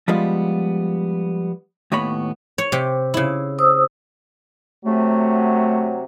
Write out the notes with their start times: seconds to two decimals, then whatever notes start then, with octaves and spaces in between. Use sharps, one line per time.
0.08 F3 G3 G#3 B3 F4
1.92 D#2 A2 B3 C#5 B5
2.58 C#5
2.72 C3 G4
3.14 C#3 E4
3.59 C5 D#6 E6
4.85 C3 F#3 A3